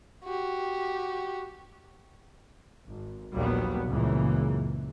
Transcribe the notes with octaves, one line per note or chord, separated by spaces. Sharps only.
F#4 G4
G#1
A#1 D#2 F#3 G3 A#3 B3
C#2 F#2 A#2 C#3 E3 A#3